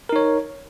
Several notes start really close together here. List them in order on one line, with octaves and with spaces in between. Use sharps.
A#4 D#4 C#5